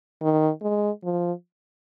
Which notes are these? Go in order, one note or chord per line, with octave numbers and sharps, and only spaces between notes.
D#3
G#3
F3